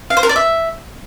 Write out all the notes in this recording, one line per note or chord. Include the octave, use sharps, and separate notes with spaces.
F5
C5
A#4
D5
E5